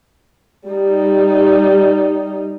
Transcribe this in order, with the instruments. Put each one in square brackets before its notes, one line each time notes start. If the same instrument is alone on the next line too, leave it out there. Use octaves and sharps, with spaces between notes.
[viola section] G3 D#4